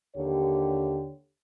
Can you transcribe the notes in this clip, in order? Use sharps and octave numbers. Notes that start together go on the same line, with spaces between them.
D#2 D3 G4 C#5